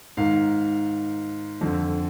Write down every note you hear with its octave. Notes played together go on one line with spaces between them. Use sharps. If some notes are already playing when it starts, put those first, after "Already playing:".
G#2 D#3 F5
F2 D3